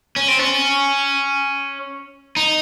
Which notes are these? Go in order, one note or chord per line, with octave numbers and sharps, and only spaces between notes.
C#4
C4
C#4
D#4